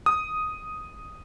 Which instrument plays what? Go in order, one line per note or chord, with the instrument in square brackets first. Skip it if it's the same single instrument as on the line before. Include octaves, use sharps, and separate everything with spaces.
[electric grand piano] D#6